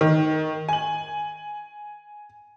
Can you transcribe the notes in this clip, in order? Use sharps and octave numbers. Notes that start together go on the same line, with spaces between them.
D#3
G#5 F#7